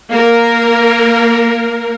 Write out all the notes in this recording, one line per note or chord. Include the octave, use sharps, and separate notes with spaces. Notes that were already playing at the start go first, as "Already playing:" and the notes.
A#3 A#4